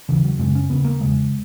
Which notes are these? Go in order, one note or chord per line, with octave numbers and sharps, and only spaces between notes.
D#2 C#3 E3
F#3
F#2 C#3 G#3
C#4
D#2 C#3 B3
A#3
E2 C#3 G#3